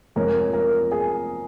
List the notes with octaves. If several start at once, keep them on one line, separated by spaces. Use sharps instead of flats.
F1 F2 F3 G#3 A#4 C#5
A#4
G#4